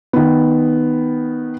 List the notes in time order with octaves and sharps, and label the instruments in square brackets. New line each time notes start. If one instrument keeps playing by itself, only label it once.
[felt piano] D#3 B3